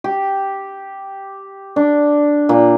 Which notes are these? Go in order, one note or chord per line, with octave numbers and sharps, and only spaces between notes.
G4
D4
A#2